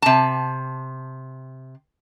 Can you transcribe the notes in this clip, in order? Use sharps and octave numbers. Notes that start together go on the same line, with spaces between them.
C3 A5